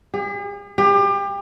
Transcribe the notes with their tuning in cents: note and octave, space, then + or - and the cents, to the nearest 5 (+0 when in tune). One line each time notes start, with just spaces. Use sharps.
G#4 -45
G4 +30